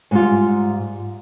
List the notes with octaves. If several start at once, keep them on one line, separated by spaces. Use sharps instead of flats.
G#2 G3 F4